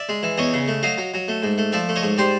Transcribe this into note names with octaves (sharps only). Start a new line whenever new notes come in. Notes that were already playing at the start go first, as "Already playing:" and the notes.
Already playing: D5 E5
G#3
E3
E2 C#5 D#5
C#3
A3
F#3 D#5 F5
F#3
F#3
A3
G#2
A3
F3 D5 E5
A3
C#5 D#5
G#2
G3 C5 D5